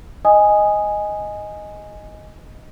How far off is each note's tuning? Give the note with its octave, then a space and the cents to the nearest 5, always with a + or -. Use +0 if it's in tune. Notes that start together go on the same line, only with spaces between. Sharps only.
D#5 +0 G#5 -5 D#6 +0